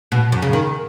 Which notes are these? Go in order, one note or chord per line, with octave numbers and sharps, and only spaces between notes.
B2
F#2
C#3
D#3